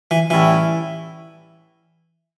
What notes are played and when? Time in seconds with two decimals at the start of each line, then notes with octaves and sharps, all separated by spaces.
0.11 E3
0.30 A2 E3 G3 C#4 E4